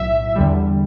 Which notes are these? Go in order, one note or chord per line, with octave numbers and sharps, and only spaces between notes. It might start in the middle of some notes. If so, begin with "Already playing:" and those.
Already playing: B1 A2 F#3 E5
E2 D3 G3